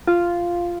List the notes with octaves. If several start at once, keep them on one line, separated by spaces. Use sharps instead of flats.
F4